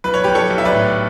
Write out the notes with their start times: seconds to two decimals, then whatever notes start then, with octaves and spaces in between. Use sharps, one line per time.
0.04 B1 B4
0.14 C#5
0.24 B1 G4 B4
0.35 A4 C#5
0.50 B1
0.58 E5
0.65 B4 D5
0.73 A2